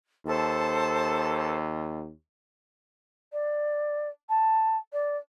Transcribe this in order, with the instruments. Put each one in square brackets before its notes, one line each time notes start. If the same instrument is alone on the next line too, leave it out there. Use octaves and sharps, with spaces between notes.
[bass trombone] D#2 [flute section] A4 C5 A5
[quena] D5
A5
D5